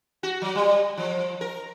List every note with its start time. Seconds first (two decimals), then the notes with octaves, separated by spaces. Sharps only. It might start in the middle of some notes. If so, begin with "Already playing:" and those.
0.23 F#4
0.42 F#3
0.55 G3
0.97 F3
1.41 A#4